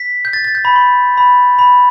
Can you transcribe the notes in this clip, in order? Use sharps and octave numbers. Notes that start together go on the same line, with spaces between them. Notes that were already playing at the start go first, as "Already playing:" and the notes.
Already playing: B6
G6
A6
A6
G6
B5
C6
B5
B5